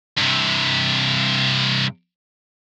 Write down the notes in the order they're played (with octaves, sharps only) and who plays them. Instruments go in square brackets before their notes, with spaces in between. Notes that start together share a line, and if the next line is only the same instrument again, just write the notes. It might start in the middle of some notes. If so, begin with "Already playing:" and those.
[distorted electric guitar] G2 C3